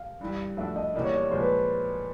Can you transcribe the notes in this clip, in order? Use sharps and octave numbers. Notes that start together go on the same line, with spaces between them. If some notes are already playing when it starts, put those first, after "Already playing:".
Already playing: F5
G2 E3 G3
F3 A3 D4 F#4 E5
D#5
E2 B2 G3 A#3 D5
C#5
D5
A#2 F3 G#3 C5
B4